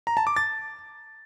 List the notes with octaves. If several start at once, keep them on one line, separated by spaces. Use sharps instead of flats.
A#5
A5
D6
A6